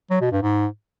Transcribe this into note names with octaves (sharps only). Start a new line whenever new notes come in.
F#3
B2
G2
G#2